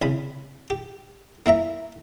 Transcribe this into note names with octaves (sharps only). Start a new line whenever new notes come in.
C2 C#3 B5
G4
A#3 E4 E5 A#5